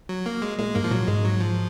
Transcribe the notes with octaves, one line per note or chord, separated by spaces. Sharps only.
F#3
A#3
G#3
A#2 G#3
G#2 A#3
F3
A#2 F#3
G#2 G#3
F#3
F3